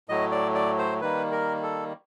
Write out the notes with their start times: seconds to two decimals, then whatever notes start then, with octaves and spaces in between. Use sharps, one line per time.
0.09 A2 F#3 A3 D#5
0.31 D5
0.55 D5
0.78 C5
1.01 D#3 G3 A#3 B4
1.32 A#4
1.63 A4